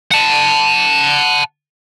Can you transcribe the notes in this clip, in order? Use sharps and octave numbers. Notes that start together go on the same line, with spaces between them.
F#5 A5